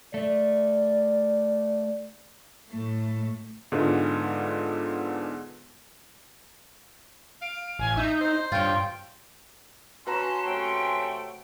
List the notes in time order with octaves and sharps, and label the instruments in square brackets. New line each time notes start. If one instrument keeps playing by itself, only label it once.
[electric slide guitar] A3 [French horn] D5
[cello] A2 A3
[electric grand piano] G#2 D3 G#3 B3 F4
[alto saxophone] F5 [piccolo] D7
[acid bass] A1 [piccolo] G#5
[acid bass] D#4 [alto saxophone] E5 [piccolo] G6
[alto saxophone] C5
[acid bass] G2 [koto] F4 C#5 [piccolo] G5
[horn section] C#4 C6 [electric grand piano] F#4 B4 A#5 [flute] A5
[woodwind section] C3 F#3 A3 [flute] G5